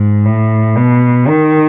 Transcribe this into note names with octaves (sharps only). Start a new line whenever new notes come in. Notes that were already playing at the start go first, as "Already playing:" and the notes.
Already playing: G#2
A2
B2
D#3